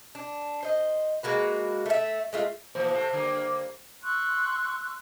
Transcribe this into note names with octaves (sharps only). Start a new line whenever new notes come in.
D4
C5 D#5
G#3 A#3 F#4 B4
A3 E5
G#3 A3 F4
A2 E3 F3 C5
C3 A3
D3 G3 A#3
C6 C#6 E6 F#6